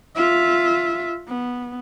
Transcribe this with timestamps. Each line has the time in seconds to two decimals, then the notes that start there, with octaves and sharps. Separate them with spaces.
0.16 F4 E5
1.28 B3